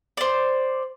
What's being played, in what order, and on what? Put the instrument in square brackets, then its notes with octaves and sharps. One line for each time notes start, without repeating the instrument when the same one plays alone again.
[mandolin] C5 D5